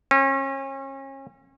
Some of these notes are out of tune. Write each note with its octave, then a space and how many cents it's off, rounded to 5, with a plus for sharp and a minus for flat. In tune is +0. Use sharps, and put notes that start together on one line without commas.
C#4 -35